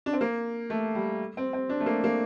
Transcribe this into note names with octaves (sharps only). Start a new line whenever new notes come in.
D4
C4
A#3
A3
G3
C4
C4
D4
A3
A#3
A#3